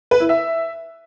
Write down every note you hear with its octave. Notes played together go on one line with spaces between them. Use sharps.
B4
E4
E5